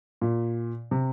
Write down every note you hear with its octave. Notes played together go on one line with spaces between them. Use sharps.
A#2
C3